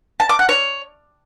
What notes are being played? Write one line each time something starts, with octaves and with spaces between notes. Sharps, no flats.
A5
D6
F#5
C#5